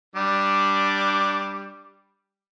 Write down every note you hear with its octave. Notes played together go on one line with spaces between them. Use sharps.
G3 D4 D6